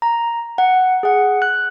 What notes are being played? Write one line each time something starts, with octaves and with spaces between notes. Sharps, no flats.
A#5
F#5
G#4 F#5
F#6